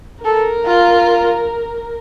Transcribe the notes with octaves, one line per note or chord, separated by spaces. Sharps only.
A4 A#4
F4